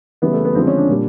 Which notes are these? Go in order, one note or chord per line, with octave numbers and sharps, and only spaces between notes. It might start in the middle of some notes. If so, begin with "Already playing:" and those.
C#3 E3 G3 B3
A3
B3
D3 F3 G#3 C4
C#4
D4
A#2 G3